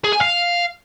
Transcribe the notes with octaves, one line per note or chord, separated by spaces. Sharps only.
G#4
G#5
F5